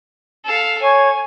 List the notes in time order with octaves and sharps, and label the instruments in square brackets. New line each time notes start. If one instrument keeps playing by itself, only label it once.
[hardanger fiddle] A4 F5
[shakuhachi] C#5 [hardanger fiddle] G#5